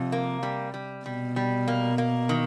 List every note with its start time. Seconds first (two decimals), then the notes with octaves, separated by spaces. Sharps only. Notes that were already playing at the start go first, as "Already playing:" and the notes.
Already playing: F2 C3
0.12 A#3
0.43 G3
0.74 G3
1.05 B2 G3
1.36 G3
1.68 A#3
1.98 A#3
2.29 D#3